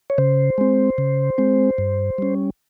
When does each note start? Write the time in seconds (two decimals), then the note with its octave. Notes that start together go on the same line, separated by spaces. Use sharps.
0.10 C#5
0.18 C#3 C5
0.58 G#3 C4
0.98 C#3
1.38 G#3 C4
1.78 G2
2.18 G3 C#4